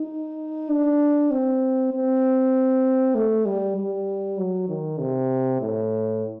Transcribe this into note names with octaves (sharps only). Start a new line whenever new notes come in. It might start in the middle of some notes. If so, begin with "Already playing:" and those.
Already playing: D#4
D4
C4
C4
A3
G3
G3
F#3
D#3
C3
A2